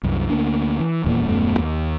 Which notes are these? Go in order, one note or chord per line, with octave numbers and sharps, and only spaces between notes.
C2 F#2
D2 A#3 D4
E3
D#1 E2 A#2 A#3
D#1 F#2 A3 B3
D#2